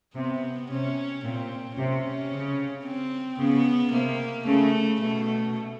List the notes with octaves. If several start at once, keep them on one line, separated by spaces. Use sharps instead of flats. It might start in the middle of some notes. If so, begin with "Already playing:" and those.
C3 B3
C3 C#4
A#2 C4
C3 C#4
C#3
C4
C#3 B3
C3 A#3
C#3 A3
B2 A3